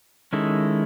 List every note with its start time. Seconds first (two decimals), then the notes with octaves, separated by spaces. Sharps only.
0.33 D#3 G#3 C#4 E4 A4